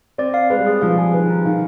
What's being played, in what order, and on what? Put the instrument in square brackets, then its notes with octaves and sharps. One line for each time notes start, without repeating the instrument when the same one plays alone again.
[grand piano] C4 [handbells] D5
[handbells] F5
[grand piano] G#3 [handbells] B4
[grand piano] G3
[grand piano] G#3 [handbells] G#4
[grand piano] F3 [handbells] F5
[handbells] G#5
[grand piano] D#3 [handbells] B4
[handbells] D#4
[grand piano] D#3 [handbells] F5